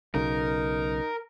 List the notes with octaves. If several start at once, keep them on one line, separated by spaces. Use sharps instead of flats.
B1 C#3 D#4 A#4